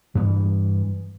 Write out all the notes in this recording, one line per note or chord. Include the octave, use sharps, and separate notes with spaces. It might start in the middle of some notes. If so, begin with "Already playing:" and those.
G2 E3 B3